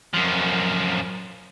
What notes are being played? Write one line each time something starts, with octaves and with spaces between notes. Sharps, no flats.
F#2 F3